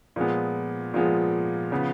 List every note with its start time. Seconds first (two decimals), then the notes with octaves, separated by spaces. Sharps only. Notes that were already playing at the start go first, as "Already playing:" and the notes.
0.16 A#2 F3 G#3 B3
0.94 A#2 F3 G#3 B3
1.72 C#3 F3 B3